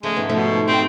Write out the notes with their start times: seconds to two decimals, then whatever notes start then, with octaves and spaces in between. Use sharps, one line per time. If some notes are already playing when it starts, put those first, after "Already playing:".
0.03 C#3 F3 G#3 A3
0.16 G#2 B3
0.29 B2 F3 A3 D#4 C#5 E5
0.68 C4 G4 G5